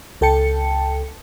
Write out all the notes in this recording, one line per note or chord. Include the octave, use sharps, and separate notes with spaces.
C#2 A4 G5 A5 C#7